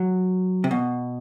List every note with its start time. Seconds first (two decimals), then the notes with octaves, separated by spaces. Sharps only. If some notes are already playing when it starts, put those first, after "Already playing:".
Already playing: F#3
0.64 C3
0.71 B2